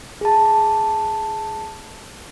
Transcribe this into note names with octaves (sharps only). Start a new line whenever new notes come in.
G#4 A5